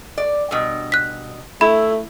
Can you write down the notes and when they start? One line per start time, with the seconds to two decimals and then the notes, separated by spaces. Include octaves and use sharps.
0.18 D5
0.51 G2 B2
0.92 F#6 B6
1.61 A3 E4 B5